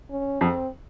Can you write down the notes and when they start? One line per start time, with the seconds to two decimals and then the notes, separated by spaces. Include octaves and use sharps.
0.11 C#4
0.41 F2 C4